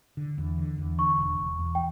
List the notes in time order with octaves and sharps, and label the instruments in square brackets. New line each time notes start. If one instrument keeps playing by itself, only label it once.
[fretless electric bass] D3
E2
D3
E2
[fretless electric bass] D3 [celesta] C#6
[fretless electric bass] E1
E1
E2
[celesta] G5